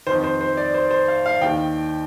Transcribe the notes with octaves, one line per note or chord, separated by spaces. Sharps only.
F2 D#3 C5
C5
C5
D5
C5
C5
F5
F5
D#2 D#3 G5